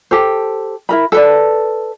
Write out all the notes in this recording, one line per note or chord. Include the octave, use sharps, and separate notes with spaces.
G4 A4 C5
E4 A#4 B5
A4 B4 D5